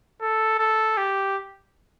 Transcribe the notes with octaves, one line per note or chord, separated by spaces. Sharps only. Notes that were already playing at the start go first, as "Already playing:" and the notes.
A4
A4
G4